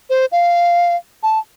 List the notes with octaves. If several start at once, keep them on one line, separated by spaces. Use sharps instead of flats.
C5
F5
A5